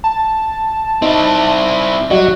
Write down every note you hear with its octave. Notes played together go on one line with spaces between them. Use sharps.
A5
C4 D#4 E4
F#3 G3 F#4 D5 D#5